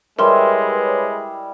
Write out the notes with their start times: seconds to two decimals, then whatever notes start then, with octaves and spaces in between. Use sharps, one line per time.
0.19 G3 G#3 E4 A#4 B4 C#5 E5 C6